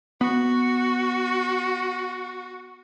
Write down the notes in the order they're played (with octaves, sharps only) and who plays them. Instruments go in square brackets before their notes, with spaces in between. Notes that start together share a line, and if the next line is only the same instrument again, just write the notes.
[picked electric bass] B3 [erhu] F#4